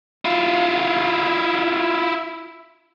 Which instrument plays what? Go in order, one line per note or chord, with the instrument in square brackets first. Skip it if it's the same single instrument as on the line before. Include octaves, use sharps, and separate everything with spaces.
[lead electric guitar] E4 F4